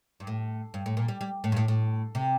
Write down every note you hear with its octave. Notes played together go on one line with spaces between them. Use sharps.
G2
A2
G2
A2
A#2
G3
G3
A2
G2
A2
A2
C3